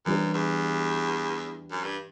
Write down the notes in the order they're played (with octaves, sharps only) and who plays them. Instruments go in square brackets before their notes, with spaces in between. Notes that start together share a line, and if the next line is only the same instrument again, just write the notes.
[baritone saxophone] F#2 [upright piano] E3 G3 D4 G4 B4
[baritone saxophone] E2
F#2
G2